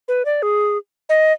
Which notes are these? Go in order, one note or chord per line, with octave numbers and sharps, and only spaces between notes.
B4
D5
G#4
D#5